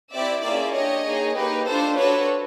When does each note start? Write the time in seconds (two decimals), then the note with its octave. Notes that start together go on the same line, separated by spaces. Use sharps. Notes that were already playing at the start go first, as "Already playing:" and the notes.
0.12 C4 E4 G4 D5 E5
0.42 A#3 C#4 F4 G#4 D5 E5
0.73 D4 G4 C#5 D#5
1.04 A#3 D#4 G#4
1.35 A#3 D#4 G4 B4
1.66 D4 F4 A4 C5
1.97 D4 F#4 A4 B4 C#5